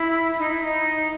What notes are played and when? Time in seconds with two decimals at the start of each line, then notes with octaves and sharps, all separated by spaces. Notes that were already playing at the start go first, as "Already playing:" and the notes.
Already playing: E4
0.38 D#4
0.49 E4
0.62 D#4